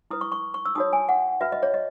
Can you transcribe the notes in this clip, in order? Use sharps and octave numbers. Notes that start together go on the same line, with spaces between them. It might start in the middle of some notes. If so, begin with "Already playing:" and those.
E4 B4 D#6
C#6
C#6
C#6
E6
D#4 F#4 C#5 D#6
G#5
F#5
F#4 B4 E5
D#5
C#5
D#5